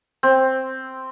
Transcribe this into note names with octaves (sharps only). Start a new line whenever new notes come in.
C4